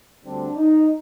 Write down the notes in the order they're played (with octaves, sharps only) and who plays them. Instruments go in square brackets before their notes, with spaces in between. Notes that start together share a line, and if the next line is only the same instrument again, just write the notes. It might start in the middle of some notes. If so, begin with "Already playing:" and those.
[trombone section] D2 D3 G3 C4 D4
D#4